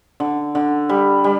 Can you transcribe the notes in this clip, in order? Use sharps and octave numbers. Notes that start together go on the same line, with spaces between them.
D3
D3
G3
G3